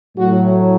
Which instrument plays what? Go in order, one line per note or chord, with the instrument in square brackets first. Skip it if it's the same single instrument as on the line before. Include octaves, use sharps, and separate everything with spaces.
[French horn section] A2 F#3 F#4